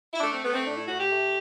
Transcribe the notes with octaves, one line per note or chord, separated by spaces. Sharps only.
E4
A3 D4
C4
A3 B3
C4
A2 D4
E4
A2 F#4
G4
A3